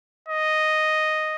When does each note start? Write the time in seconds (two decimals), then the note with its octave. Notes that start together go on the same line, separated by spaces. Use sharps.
0.29 D#5